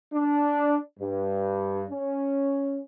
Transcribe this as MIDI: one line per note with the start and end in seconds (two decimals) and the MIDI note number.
0.13 0.76 62
1.00 1.85 43
1.90 2.79 61